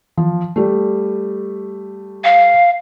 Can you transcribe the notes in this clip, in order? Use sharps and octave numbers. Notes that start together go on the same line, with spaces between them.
F3
G3 A3
F5